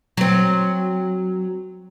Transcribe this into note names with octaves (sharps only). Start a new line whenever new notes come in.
F#3 C4